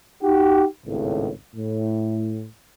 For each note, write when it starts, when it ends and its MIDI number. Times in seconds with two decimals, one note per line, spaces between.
0.23 0.64 63
0.23 0.64 66
0.23 0.64 67
0.86 1.30 32
0.86 1.30 37
0.86 1.30 45
1.55 2.47 45